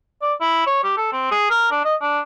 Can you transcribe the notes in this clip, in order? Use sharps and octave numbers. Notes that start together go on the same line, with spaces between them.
D5
E4
C#5
G4
A4
C4
G#4
A#4
D4
D#5
D4